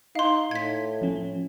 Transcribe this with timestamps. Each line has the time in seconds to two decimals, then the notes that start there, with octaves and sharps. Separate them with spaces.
0.15 D#4 F5 C6
0.51 A2 G#6 B6
1.02 F3 C#4